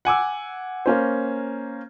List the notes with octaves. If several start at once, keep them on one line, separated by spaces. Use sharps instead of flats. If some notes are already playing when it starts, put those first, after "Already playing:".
F#5 G#5 D6 E6
A#3 C#4 C5